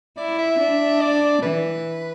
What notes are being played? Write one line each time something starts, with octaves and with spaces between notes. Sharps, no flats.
E4 D5
E5
D4
D5
E3 B4